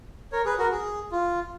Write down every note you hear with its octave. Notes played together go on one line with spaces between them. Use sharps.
A#4 C#5
G#4 B4
F#4 A#4
G#4
F4